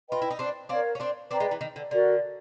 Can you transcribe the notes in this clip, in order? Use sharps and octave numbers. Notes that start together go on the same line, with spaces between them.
F4 B4 D#5 G5 B5
E4
D#4
C4 D4
C4 D4 A#4 C#5 F5
C#4
C4 D4
C4 D4 B4 D5 G5 A#5
G#3
E3
D#3
D3
D3 F#4 A#4 D5